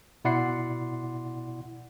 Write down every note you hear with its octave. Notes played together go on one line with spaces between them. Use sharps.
B2 E4 D5 F#5 C6 C7